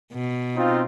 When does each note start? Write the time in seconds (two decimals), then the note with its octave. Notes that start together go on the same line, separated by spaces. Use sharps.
0.13 B2
0.55 C4 D#4 F4